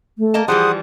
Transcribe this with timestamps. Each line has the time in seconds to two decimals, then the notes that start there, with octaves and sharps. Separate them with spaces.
0.19 A3
0.34 A#3 D#5 A5
0.48 E3 F3 G3 G#4 C5 F#5 D#6